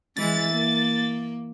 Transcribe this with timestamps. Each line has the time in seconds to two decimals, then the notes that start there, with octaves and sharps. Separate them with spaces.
0.17 E3 G#3 E4 A6
0.51 A#3